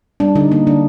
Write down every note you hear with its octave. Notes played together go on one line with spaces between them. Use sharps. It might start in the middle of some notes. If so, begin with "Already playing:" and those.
G3 D4
D3 D#4
A#3 D#4
D3 D4